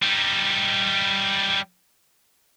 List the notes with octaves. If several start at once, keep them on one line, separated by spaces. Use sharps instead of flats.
G3 D#4